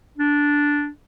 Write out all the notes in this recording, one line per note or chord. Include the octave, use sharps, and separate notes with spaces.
D4